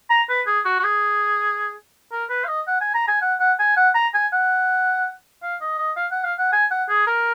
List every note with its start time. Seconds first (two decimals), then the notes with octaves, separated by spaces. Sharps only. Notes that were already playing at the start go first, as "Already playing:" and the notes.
0.10 A#5
0.29 B4
0.47 G#4
0.65 F#4
0.79 F#4
0.84 G#4
2.11 A#4
2.30 B4
2.44 F5
2.48 D#5
2.67 F#5
2.81 G#5
2.94 A#5
3.08 G#5
3.22 F#5
3.40 F#5
3.59 G#5
3.77 F#5
3.95 A#5
4.14 G#5
4.32 F#5
5.42 F5
5.61 D#5
5.78 D#5
5.96 F5
6.11 F#5
6.24 F5
6.38 F#5
6.52 G#5
6.71 F#5
6.89 G#4
7.07 A#4